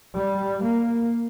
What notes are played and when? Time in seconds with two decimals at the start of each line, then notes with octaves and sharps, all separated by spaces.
0.15 G3
0.63 A#3